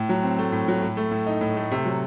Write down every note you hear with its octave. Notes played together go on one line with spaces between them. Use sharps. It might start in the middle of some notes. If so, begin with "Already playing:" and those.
Already playing: A2
F#3
C4
A3
A2
F#3
A2
A3
A2
D#4
A2
A3
C3
F#3